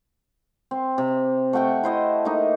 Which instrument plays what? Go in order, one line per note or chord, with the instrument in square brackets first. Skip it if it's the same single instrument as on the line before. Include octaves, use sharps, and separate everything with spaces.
[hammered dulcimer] C4
C3
A3 F#5 G5 C#6
E4 C5 D#5
A3 A#3 D#4